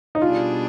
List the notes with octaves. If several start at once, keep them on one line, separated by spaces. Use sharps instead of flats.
D#4
B2 G3 D4 F4 G#4